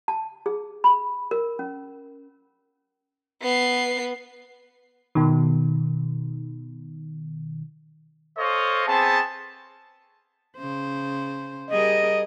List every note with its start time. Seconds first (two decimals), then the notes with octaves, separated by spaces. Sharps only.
0.08 A5
0.46 G#4
0.84 B5
1.31 A#4
1.59 C#4
3.42 B3 C7
5.15 B2 D#3
8.37 A4 C5 C#5 D#5 F5
8.86 B3 C4 G#4 A5
10.57 C#3 C5
11.71 G3 G#4 A#4 D#5